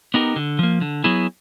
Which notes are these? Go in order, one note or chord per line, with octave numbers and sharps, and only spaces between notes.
B3 D#4 G4 A#4
D3
F3 A#3
D3
F#3 B3 E4 G#4